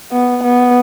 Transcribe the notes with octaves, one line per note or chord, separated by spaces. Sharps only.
B3
B3